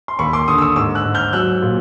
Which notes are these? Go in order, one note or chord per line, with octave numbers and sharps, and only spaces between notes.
C6
D#2 B5 C#6
C6 D6
D3 C#6 D#6
E6
C#6 D#6
G#2 D6 E6
E6 F#6
G#2
F6 G6
F#3 E6 F#6
A#2